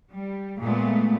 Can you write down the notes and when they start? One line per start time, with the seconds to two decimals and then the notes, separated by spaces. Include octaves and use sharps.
0.11 G3
0.61 A#2 G#3 A3 B3